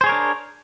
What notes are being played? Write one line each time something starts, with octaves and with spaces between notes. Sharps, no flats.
D4 G#4 A#4 C5 C#5